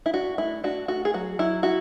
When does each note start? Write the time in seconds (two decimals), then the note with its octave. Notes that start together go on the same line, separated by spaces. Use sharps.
0.06 E4
0.14 D4 F#4
0.38 A3 E4
0.64 D4 F#4
0.88 A3 F#4
1.05 G#4
1.14 F#3 F#4
1.39 F#3 E4
1.63 E4 F#4